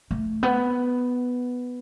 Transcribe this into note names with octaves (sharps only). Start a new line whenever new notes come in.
A3
B3